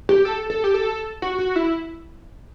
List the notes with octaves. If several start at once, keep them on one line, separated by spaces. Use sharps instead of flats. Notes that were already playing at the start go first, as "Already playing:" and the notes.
G4
A4
A4
G4
A4
F#4
F#4
E4